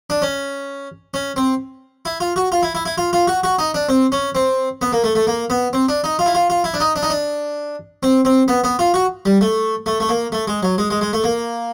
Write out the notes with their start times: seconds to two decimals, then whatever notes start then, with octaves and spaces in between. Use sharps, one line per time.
0.10 D4
0.22 C#4
1.14 C#4
1.36 C4
2.05 E4
2.20 F4
2.36 F#4
2.52 F4
2.63 E4
2.75 E4
2.85 E4
2.98 F4
3.13 F4
3.27 F#4
3.44 F#4
3.59 D#4
3.74 D4
3.89 C4
4.12 C#4
4.35 C4
4.82 B3
4.92 A#3
5.04 A3
5.15 A3
5.27 A#3
5.50 B3
5.73 C4
5.89 D4
6.04 D#4
6.19 F4
6.26 E4
6.35 F4
6.50 F4
6.64 E4
6.74 D4
6.80 D#4
6.96 D4
7.03 D#4
7.10 D4
8.03 C4
8.25 C4
8.48 B3
8.64 B3
8.79 F4
8.94 F#4
9.26 G3
9.41 A3
9.86 A3
10.00 A3
10.09 A#3
10.32 A3
10.48 G#3
10.63 F#3
10.78 G#3
10.90 G#3
11.01 G#3
11.13 A3
11.24 A#3